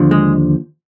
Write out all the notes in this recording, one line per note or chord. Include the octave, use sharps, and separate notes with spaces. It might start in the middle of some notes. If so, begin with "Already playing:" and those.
Already playing: D#2 D3 F3
G#3